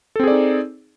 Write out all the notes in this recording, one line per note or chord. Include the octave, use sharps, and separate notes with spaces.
C4 D#4 G#4 A4 D5